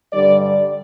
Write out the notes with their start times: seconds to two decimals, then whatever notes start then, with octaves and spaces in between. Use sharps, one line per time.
0.13 G2 D3 G3 D5
0.40 D5